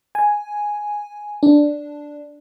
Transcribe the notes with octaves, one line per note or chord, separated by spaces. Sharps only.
G#5
D4